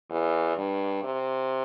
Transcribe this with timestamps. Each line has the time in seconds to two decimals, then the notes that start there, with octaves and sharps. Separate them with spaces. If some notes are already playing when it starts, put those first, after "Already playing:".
0.10 E2
0.57 G2
1.03 C3